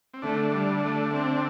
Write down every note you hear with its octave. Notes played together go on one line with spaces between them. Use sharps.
C4
D3 A3 D4
G3
A3
C4